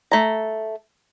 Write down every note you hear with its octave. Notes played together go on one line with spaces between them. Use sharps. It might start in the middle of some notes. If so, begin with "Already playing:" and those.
A3 A#5